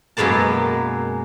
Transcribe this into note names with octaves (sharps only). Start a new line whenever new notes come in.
F#2 B2 G#3 A#3 A5